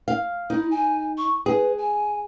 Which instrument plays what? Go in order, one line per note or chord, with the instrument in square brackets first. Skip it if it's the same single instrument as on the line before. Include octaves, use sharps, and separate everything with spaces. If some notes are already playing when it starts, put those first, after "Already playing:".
[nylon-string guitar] F5
[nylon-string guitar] D#4 [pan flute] E4
[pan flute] G#5
C#6
[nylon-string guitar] G#4 [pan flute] B4
[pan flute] G#5